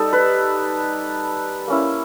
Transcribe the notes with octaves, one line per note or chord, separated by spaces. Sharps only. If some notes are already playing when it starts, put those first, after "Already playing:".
Already playing: G3 D#4 A4
B4
A#3 C#4 E4